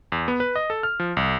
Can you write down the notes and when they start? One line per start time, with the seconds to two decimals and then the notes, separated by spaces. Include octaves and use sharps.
0.12 E2
0.28 B3
0.40 B4
0.56 D#5
0.70 A4
0.83 F6
1.00 F3
1.17 C2